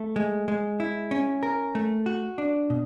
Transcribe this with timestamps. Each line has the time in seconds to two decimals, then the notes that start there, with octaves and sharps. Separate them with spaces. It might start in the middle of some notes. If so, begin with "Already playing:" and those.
Already playing: A3
0.16 G#3
0.48 G#3
0.80 E4
1.11 C#4
1.43 A#4
1.75 A3
2.06 F#4
2.38 D4
2.70 B2